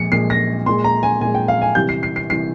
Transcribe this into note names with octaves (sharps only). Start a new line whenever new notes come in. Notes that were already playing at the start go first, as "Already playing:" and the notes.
Already playing: A#2 F3 G#3 C#7
A#2 F3 G#3 C7
A#6
A#2 G#3 C6
A#5
G#5
A#2 G#3 G#5
G5
F5
G#5
C3 E3 G3 G6
C7
C7
C7
C3 E3 G3 C7